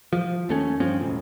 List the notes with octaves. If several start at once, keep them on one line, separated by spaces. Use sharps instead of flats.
F3
D#2 A3 C#4
G2 F3 C4 C#4
E1 A1